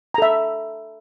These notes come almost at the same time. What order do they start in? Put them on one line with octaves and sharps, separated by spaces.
A#5 A4 E5